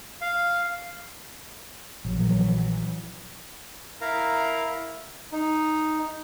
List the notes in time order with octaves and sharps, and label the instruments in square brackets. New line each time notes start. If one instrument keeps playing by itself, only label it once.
[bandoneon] F5
[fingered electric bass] A#1 [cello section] E3 F#3
[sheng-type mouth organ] E4 A#4 F5 A#5
[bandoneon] D#4